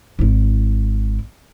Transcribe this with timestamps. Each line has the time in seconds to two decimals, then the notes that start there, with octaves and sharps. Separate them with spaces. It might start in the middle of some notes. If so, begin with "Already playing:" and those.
0.19 G#1 E4